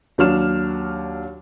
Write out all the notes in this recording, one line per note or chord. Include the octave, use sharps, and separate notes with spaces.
D#2 F#3 D4 F6 E7